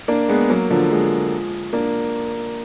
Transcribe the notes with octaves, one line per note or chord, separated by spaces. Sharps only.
A#3 D4
G#3 B3
F#3 A#3
D3 F3
F3 G#3
A#3 D4